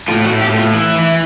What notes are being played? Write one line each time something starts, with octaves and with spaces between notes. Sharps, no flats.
A2 F4
F#4
A2
G4
A2
F4
E3 E4
E3